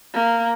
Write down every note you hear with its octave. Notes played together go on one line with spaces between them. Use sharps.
A#3